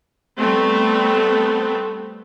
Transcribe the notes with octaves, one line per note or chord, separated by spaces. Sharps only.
G3 A3 B3 C4